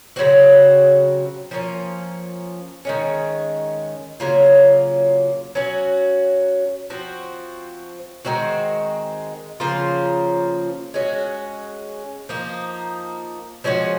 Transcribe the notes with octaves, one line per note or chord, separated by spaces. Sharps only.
C#3 F#3 C4 F#4
F3 A#3 C#4
D#3 G#3 C#4
C#3 F#3 A#3 F4
F#3 C#4 F#4
F3 C4 F#4
D#3 G#3 C4 F#4
C#3 F3 A#3 F4
G#3 C#4 F#4
F3 A#3 D#4
F3 G#3 C#4 F#4